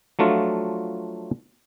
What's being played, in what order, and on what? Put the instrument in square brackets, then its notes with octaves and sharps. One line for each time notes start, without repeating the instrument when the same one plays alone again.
[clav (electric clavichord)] F3 F#3 A3 D4 F4